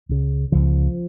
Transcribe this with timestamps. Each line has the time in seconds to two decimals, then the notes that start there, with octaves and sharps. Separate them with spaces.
0.09 C#2 C#3
0.52 C#2 C#3 F3